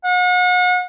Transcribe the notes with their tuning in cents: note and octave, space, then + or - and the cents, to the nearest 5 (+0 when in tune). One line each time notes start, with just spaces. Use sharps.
F#5 -40